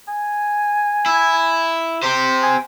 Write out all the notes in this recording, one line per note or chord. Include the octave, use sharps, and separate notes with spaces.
G#5
E4
G4 C5
G#5